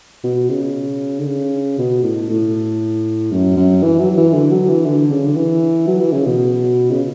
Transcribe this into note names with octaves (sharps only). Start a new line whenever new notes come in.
B2
C#3
D3
C#3
B2
A2
A2
F#2
F#2
E3
F#3
F#3
E3
D3
F#3
E3
D3
C#3
D3
E3
F#3
E3
C#3
B2
C#3